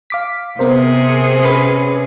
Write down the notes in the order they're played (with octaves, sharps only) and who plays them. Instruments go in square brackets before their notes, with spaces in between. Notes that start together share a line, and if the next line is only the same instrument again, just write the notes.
[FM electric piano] F5 D6 B6
[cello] C3 G#4 [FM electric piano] B3 A#4 C5
[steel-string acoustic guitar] C#4 B4